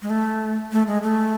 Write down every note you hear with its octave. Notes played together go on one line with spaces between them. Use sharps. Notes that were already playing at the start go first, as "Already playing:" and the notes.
G#3
A3
A3
G#3
A3